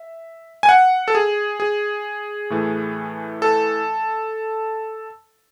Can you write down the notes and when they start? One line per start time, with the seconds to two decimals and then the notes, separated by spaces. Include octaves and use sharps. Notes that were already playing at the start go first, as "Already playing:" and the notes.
Already playing: E5
0.63 G#5
0.69 F#5
1.08 A4
1.15 G#4
1.60 G#4
2.50 A2 E3 A3
3.42 A4